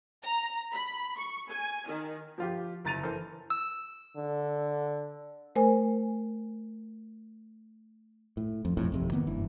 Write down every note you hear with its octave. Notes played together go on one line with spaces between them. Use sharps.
A#5
B5
C#6
G#5
D#3
F3 F4 G4
F#1 A#5 A6 D#7 F7
E3 A4 A#4 C5
E6
D3
A3 A#4 C5 G#5
A2
F2
B1 F2 A2
G#1 F2 C3
D#3 A#3 B3
F#1 G2 E3